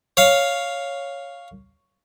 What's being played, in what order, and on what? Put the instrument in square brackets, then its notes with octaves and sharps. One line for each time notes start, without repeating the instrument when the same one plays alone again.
[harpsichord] C#5 F5